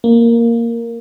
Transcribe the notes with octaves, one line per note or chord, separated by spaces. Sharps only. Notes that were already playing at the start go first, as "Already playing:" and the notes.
A#3